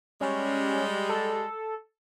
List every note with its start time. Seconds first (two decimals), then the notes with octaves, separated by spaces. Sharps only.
0.21 G3 G#3 C#4
1.09 A4